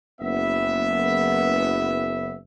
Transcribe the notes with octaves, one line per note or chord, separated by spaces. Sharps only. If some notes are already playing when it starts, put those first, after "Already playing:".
F#1 B3 E5